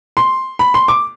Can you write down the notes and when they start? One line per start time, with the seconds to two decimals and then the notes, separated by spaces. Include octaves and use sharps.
0.17 C6
0.59 B5
0.74 C6
0.88 D6